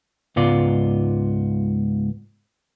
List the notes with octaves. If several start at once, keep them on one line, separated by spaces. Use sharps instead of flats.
C#2 G#2 B3 F4 D5